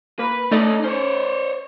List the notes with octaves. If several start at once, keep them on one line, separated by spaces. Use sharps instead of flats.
A#3 B4
A3 C#4 D#4 D5 D#5
C#4 C5 C#5